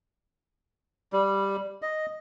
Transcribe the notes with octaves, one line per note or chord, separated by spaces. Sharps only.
G3
D#5